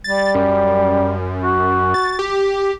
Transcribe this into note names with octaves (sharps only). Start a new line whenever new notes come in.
G3 A6
F#2
F#4
A6
G4